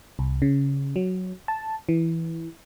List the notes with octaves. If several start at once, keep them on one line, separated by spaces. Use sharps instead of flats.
C2
C#3
F#3
A5
E3